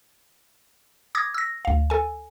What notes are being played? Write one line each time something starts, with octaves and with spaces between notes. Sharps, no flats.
D6 D#6 G#6 A#6
E6 A#6
D2 F5
A4 G#5